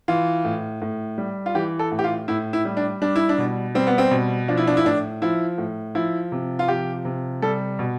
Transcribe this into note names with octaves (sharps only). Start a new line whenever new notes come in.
E3 F4
A2
A2
G3
F4
E3 G4
A4
A2
G4
F4
A2 E4
E4
G3
D4
G3 D4
E4
D4
B2
G3 C4
B3
C4
B2
F3 D4
E4
D4
E4
A2 D4
F3 E4
A2
F3 E4
C3
F4
F3 G4
C3
G3 A4
B2